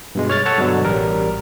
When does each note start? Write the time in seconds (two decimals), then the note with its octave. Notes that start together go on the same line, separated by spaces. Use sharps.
0.15 G2 B2 G#3
0.29 C#5 F6 A6
0.46 A4 C#5 F#5 A5
0.58 G2 B2 D3 F#3
0.85 A1 G3 A#4